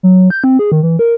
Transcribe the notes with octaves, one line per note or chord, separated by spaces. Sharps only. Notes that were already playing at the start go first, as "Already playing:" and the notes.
F#3
G6
C4
G#4
D#3
E3
A#4